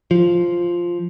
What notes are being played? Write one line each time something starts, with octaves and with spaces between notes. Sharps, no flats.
F3